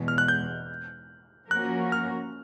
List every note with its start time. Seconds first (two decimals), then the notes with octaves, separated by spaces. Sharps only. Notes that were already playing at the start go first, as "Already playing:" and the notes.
Already playing: E2 B2 G#3
0.08 F6
0.18 F#6
0.28 G6
1.50 F3 A#3 C#4 F#4 A#4 F#6
1.92 F6